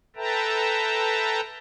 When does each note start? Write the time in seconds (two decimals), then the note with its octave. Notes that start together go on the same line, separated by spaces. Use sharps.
0.16 A4 B4 E5 G5 A5 A#5